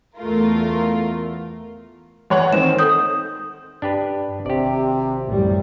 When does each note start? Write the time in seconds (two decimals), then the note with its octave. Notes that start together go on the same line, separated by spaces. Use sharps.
0.18 E2 A3 F4 A#4
2.30 E2 C#5 F#5
2.53 D#3 C4 E7
2.79 A4 D#6 G6
3.82 G2 D4 G4 B4
4.46 G#1 C3 G4 D5
5.28 A1 F#2 G3